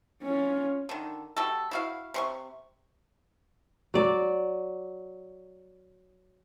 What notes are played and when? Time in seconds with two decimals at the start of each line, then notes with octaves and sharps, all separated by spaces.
0.23 C#4 F4
0.89 D3 D#3
1.37 G3 F#4 A4
1.71 E4 F#4 F5
2.14 C3 C6 C#6
3.94 F#3 D5